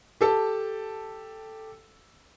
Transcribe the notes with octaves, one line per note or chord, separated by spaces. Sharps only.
G4 A4 A5